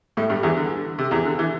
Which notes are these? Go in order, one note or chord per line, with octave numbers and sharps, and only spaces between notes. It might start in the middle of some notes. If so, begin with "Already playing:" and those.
A2 A3
G2 G3
E2 E3
D3
C3
E2 E3
D3
E3